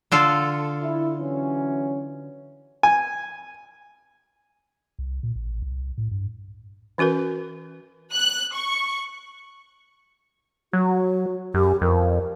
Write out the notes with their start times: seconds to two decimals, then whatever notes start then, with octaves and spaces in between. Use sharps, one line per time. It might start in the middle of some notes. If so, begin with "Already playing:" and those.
0.12 D3 F4 A4
0.81 E4
1.18 E3 F#3 C#4
2.83 G#5
4.99 C2
5.23 A#2
5.36 A1
5.62 C2
5.98 A2
6.11 G2
6.98 E3 C#4 F#4 A#4 B4
8.15 F#6
8.56 C#6
10.73 F#3 F#4
11.54 F#2 G4
11.81 F2 A#4